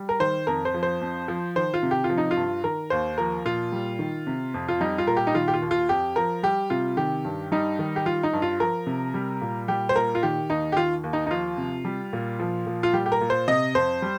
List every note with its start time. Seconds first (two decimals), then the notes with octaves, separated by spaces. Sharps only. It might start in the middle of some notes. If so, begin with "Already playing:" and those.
Already playing: G3
0.09 A#4
0.20 D#3 C5
0.47 F2 A#4
0.65 C5
0.74 F3
0.83 C5
1.01 F2
1.28 F3
1.56 D#3 C5
1.74 F4
1.83 C3
1.91 G4
2.04 F4
2.10 F3
2.18 D#4
2.31 F4
2.37 G2
2.63 D#3 A#4
2.90 D#2 C5
3.18 F3 A#4
3.45 A#2 F4
3.72 G3
3.99 D#3
4.27 C3
4.54 F2
4.68 F4
4.81 G3 D#4
4.98 F4
5.07 A#2 A#4
5.17 G4
5.27 D#4
5.34 D#3 F4
5.48 G4
5.54 F4
5.62 D#2
5.71 F4
5.89 F2 G4
6.16 F3 A#4
6.43 G3 G4
6.70 C3 F4
6.97 D#3 G4
7.25 G2
7.52 G3 D#4
7.79 D#3
7.96 G4
8.06 G3 F4
8.23 D#4
8.33 G2
8.42 F4
8.60 F3 A#4
8.87 C3
9.14 G3
9.41 A#2
9.68 G3 G4
9.89 C5
9.95 A#2 A#4
10.15 F4
10.23 D#3 G4
10.50 D#2 D#4
10.72 G4
10.77 D#3 F4
11.04 D#2
11.13 D#4
11.27 D#4
11.30 F3 F4
11.58 C3
11.85 G3
12.13 A#2
12.39 F3
12.67 A#2
12.83 F4
12.93 G3 G4
13.06 G4
13.12 A#4
13.21 A#2
13.30 C5
13.48 C3 D#5
13.75 F2 C5
14.02 G3